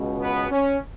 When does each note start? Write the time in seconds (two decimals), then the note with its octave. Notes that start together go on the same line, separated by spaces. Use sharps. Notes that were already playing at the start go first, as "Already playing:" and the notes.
Already playing: C#2 B2
0.21 B3
0.51 C#4